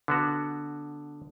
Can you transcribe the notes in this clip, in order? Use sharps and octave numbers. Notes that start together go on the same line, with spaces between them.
D3 B3 F#4